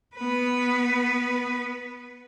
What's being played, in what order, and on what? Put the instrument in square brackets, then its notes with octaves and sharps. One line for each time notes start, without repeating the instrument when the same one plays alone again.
[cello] B3 B4